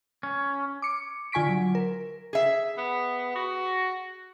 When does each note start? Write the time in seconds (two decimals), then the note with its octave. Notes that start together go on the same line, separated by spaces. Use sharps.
0.23 C#4
0.82 D6 C#7
1.32 D3 F4 G#5 C#6 B6 D7
1.48 F#3
1.75 A#4
2.33 G#4 E5
2.78 B3
3.35 F#4